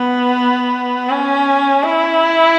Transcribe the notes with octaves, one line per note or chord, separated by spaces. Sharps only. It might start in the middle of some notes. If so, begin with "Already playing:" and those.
Already playing: B3
C#4
E4